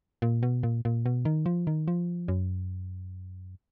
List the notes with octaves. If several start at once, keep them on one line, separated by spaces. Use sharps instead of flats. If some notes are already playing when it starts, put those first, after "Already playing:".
A#2
B2
A#2
A#2
B2
D#3
F3
D#3
F3
F#2